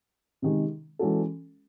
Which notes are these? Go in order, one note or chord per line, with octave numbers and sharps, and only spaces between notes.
C3 D#3 G#3
E3 G#3 C#4 F#4 A4